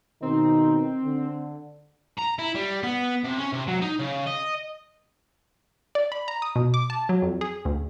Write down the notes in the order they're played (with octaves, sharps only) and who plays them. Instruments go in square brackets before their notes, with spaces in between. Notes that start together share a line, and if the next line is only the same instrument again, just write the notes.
[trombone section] B2 D#3 D#4 [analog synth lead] C4
[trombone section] D3
[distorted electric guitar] A#5
E4
G3
B3
C3
C#4
C3
F#3
D#4
C#3
D#5
[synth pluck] D5
B5
A#5
D#6
B2
D6
A5
F#3
F2
G#4
D2